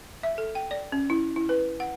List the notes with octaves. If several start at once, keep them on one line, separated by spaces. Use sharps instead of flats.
E5
A4
G5
D5
C#4
E4
E4
B4
F#5